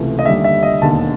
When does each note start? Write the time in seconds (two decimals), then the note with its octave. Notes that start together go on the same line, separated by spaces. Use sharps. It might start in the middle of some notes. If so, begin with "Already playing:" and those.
Already playing: C#2 C3 E3 A3
0.19 D#5
0.26 D#2 D3 G3 E5
0.44 E5
0.63 D#5
0.82 E1 D#2 D3 A5